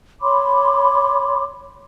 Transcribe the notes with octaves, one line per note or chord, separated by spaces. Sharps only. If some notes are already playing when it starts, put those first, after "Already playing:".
C#5 B5 C6 D6